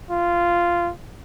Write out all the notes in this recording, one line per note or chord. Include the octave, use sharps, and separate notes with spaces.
F4